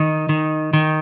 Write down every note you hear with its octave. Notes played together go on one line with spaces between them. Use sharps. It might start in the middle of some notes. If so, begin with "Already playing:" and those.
Already playing: D#3 D#4
D#3
D#3